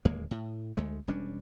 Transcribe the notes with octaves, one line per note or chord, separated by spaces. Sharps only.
D1 D#2 G#3 A#3
A2
D2 G#3 A3
E1 G3 C#4 D4